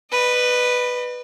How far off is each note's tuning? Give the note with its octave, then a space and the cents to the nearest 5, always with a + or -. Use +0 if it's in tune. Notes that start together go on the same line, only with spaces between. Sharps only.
B4 +0 D#5 -45